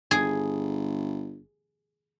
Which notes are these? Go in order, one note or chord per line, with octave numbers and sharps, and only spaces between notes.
G1 G#4